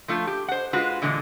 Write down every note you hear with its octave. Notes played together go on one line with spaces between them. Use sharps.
F3 A3 F4
G4
C5 F#5
G#3 F4 F#4 B4
A#2 D3 E3 G#3